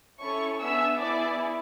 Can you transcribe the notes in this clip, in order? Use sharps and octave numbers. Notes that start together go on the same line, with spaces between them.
C#4 E4 A4 C#5 C#6
B3 D4 G#4 E5 E6
B3 E4 G#4 D5 D6